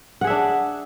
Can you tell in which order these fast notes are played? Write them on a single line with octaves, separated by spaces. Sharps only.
F#5 G#4 E5 D4